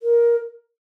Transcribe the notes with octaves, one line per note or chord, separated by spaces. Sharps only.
A#4